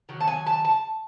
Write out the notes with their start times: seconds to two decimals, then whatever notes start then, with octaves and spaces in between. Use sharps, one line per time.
0.09 D#3 F#3
0.20 A5
0.27 G#5
0.46 A5
0.65 A5